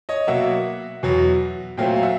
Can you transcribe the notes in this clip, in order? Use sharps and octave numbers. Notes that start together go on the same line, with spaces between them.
C#5 D#5
B2 F#3 A#3 E5 F#5
E2 B2 F#3
A#2 F#3 A3 C4 F5 G5
F5
E5 F#5